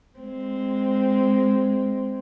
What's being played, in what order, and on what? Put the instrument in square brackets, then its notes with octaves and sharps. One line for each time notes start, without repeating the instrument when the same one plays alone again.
[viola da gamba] G#3 C4